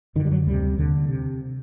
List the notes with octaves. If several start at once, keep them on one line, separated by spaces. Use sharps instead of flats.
F#2 D3 D#3
G3
F#3
D2 C3 G3
D#2 D3
C3